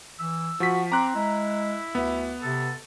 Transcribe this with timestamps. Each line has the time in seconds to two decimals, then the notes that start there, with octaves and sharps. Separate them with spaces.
0.20 E3 E6
0.60 F3 F#4 B6
0.92 C4 A#5 D6 F#6
1.15 G#3 E4
1.95 D2 B3
2.42 C3 A4